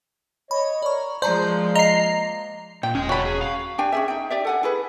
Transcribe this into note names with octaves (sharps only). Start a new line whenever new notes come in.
C#5 D#5 B5
A#4 C#5 D5 C#6
F3 G#3 A#3 C5 D5 A5 A#5
D#5 A#5 C7
A#2 G5
E1 C#4 D#5 G#5
A#2 F#3 F#4 F#5 A5 B5
G#4
F5
D4 G4 G5 G#5
C#4 G#4 E5
D#4 G5
G4 D5 E5
A4 F#5 G#5
E4 G#4 B4